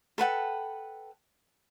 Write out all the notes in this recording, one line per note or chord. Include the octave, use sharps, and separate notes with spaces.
A4 B4 F#5 G5